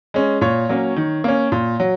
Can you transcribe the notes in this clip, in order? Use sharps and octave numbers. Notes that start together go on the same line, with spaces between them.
G#3 C#4
A#2 C#5
F#3 A#3 C#4
D#3
A#3 C#4
A#2
F#3